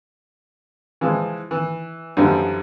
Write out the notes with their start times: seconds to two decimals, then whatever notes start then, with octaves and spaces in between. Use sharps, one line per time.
1.01 E3 F3 G#3
1.51 E3
2.17 F#2 D3 E3 F3 G3